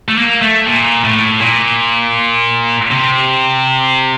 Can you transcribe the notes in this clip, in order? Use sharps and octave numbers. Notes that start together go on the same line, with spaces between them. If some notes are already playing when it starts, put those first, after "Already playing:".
A3
A#3
A3
A#2
A2
A#2
C3